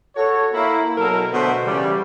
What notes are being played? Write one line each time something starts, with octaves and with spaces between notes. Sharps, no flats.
F#4 A4 C#5
A#3 E4
B2 F#3 A4 A#4
B2 D3 A3 B3 C5
C#3 E3 G3